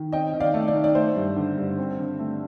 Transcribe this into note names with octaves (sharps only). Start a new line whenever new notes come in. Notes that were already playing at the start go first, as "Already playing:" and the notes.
Already playing: D#3
C4 D#5 G5
D#3
D5 F5
A3
D5
D#4
D5
A3 C5
G2
D3
G2
C4
D3
A3